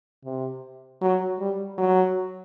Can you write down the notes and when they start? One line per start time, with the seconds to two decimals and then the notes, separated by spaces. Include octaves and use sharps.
0.25 C3
1.01 F#3
1.39 G3
1.78 F#3